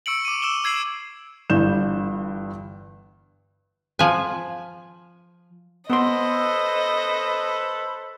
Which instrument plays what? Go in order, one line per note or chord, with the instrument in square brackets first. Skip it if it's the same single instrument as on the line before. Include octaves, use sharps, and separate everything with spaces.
[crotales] C#6 E6 C#7 D7 F#7
D6 D#7
E6 E7 G7
E6 G#6 C7 F#7
[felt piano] G1 G2 E3 G6 E7
[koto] F3 G#5
[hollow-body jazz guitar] B3 C6 [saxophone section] A4 B4 C5 [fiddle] D#5